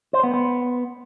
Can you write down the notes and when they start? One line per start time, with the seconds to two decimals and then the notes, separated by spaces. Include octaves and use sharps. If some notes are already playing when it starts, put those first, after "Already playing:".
0.13 C5
0.23 B3
0.34 B3